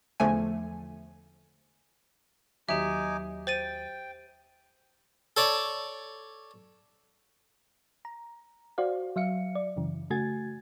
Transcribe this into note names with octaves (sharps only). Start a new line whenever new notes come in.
E2 D3 F3 A3 G#5
D#2 F#3 D#4 G4 E5 G#5 D6
C5 G5 A6 D#7
A4 C#5 D5
A#5
F#4 C5 D5 F5
F#3 E5 F5 C#7
D5
F#2 C#3 E3
C#3 A3 F#4 G#5 G#6 A6